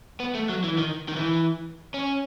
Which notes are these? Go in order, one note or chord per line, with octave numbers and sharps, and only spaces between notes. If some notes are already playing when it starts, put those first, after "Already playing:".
B3
A3
F#3
E3
D#3
D#3
E3
C#4